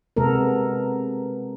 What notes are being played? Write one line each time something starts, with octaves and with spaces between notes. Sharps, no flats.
C3 G#3 B3 A4 A#4